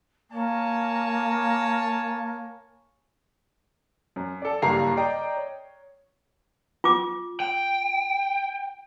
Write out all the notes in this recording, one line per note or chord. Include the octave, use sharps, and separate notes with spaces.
A#3 C#5 G#5 A5
F#2
A4 D5
F#1 G2 G3 A#3 A#5 C7
D5 D#5 G5 A#5
C#5
F4 D6
G5